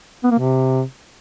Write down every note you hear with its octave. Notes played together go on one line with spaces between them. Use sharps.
B3
A#3
C3